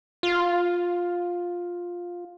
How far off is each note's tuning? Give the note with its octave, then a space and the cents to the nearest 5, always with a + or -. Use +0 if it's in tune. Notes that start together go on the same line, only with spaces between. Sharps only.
F4 +10